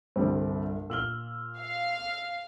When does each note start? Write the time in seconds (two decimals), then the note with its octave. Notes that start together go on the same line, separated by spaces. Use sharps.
0.16 G1 C2 D3 G3 C4
0.90 A#2 E6 F6 F#7 G7
1.58 F5